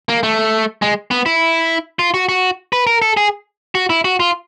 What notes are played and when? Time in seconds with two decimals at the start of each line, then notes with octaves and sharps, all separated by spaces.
0.09 A#3
0.23 A3
0.82 G#3
1.11 B3
1.26 E4
1.99 F4
2.14 F#4
2.29 F#4
2.73 B4
2.87 A#4
3.02 A4
3.17 G#4
3.75 F#4
3.90 E4
4.05 F#4
4.20 F4